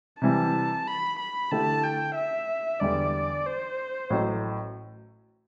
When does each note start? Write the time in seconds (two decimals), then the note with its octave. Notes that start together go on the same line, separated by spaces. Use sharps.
0.22 C3 E3 G3 A5
0.87 B5
1.19 B5
1.51 D3 A3 E4 G4 A5
1.84 G5
2.16 E5
2.81 E2 D3 G3 D5
3.46 C5
4.10 A1 A2 F#3